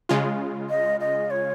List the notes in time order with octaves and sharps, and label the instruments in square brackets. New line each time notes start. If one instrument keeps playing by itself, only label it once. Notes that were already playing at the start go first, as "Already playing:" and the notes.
[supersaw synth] C#3 G#3 F4
[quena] D#5
D#5
C#5